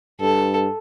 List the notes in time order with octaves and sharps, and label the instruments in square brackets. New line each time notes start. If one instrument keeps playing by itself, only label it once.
[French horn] G2 [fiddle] A4